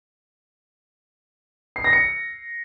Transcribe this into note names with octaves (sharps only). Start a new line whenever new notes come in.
C7
A#6
C#7